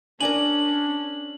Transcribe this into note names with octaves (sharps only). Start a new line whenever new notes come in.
C#4 D4 A#4 D5 G#5 F#7